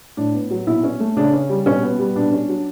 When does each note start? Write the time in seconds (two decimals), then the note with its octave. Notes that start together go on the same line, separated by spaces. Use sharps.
0.17 A2 D4
0.34 B3
0.51 F#3
0.67 B2 E4
0.83 C#4
1.00 A3
1.17 C#3 D4
1.33 C#4
1.50 G3
1.65 B2 C#4
1.83 B3
1.99 G3
2.16 B2 D4
2.32 C#4
2.49 F#3